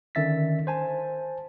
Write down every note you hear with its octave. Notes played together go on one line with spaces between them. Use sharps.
D3 D#3 C#4 E5 A6 B6
C5 G#5 A5